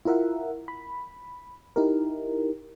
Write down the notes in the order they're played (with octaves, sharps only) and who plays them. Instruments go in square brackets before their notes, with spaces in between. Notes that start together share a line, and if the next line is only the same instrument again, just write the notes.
[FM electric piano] E4 F4 A#4 E5 F#5
B5
D#4 E4 G4 A#4